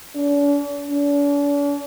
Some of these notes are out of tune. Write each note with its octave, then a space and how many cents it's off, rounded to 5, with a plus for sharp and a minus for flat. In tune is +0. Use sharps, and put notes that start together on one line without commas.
D4 -45
D4 -45